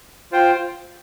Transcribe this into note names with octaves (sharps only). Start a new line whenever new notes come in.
F4 C5 G5